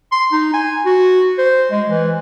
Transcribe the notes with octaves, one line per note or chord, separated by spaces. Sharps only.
C6
D#4
G#5
F#4
C5
G#3
E3